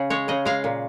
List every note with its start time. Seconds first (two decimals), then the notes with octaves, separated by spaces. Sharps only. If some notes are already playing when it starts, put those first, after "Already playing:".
Already playing: C#3 G#4
0.10 G#3 C#5
0.28 C#3 D#5
0.45 G#3 F5
0.64 A#2